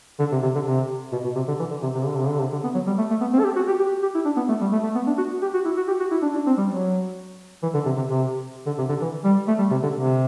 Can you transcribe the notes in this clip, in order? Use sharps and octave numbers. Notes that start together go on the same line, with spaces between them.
D3
C3
C3
D3
C3
B2
B2
C3
D3
E3
D3
C3
C3
D3
C3
D3
C3
D3
B3
F#3
G3
A3
A3
B3
C4
A4
G4
F#4
G4
G4
G4
E4
D4
B3
A3
G3
A3
A3
B3
D4
F#4
G4
F#4
E4
F#4
G4
F#4
E4
D4
D4
C4
G3
F#3
E3
D3
C3
C3
C3
D3
C3
D3
E3
G3
A3
G3
C3
D3
C3